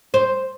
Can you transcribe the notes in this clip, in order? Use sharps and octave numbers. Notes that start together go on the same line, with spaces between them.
C5